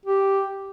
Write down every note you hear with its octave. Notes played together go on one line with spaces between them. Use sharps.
G4